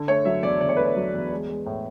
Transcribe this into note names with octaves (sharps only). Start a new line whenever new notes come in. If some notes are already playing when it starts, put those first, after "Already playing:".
Already playing: D3
A3 C#5
F#3 E5
E2 D5
D3 D5
C#5
A3 B4
C#5
F#3
E2
G#3
G#3
A2